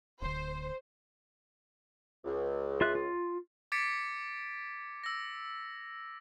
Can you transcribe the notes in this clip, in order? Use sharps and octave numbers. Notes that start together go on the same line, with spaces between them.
D1 D2 C5
C#2
F4 E5 F#6
F4
D6 G#6 A6 B6 C#7 D7
E6 A#6